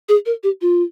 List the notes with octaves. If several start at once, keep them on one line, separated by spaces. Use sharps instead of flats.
G#4
A#4
G4
F4